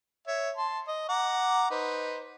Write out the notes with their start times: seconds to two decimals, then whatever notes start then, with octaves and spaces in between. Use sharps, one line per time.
0.27 C#5 E5
0.57 A5 C6
0.88 D#5
1.09 F#5 A#5 D6
1.70 D#4 B4 C5